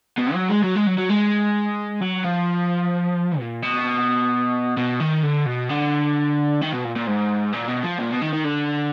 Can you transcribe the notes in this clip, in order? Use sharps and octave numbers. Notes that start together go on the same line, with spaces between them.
B2
F#3
G#3
F#3
G#3
F#3
F#3
G#3
F#3
F3
A#2
B2
B2
D#3
D3
B2
D3
D#3
B2
A#2
A#2
G#2
A#2
B2
F3
A#2
B2
D#3
D#3
D3